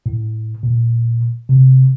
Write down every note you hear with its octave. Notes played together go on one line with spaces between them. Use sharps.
A2
A#2
C3